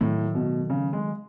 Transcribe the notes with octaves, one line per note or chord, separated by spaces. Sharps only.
A2 D#3 F#3 A3
B2
C#3
G#3